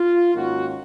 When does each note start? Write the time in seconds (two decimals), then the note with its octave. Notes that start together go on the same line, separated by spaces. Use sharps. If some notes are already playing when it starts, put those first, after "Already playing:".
Already playing: F4
0.35 G#2 D#3 A#3 C#4 F#4